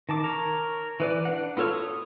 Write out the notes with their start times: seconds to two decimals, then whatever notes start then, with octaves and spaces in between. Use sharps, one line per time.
0.09 D#3 A5 D6
0.24 A#4 C#5
1.00 E3 B4 D5
1.25 D4 F#5
1.57 B3 F4 A4 C#5 F6
1.73 D#6